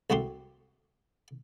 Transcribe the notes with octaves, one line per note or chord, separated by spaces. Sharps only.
C2 A3 F#4 G4 C6